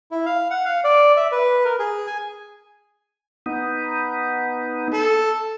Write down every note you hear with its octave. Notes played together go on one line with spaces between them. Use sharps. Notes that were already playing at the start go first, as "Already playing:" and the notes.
E4
F5
F#5
F5
D5
E5
B4
A#4
G#4
G#5
B3 D#4
A4